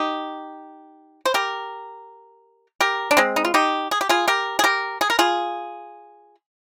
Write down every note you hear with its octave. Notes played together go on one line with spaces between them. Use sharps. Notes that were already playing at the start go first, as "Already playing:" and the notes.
Already playing: D#4 G4
C5
G4 A#4
G4 A#4
D4
G#3 C4
D#4
F4
D#4 G4
G#4
G4
F4 G#4
G4 A#4
G#4
G4 A#4
G#4
A#4
F4 G#4